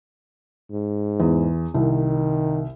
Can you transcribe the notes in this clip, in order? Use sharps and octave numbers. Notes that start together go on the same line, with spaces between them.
G#2
E2
C2 D#3